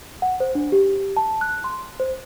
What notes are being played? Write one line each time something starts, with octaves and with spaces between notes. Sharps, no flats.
F#5
C5
D4
G4
A5
F#6
C6
C5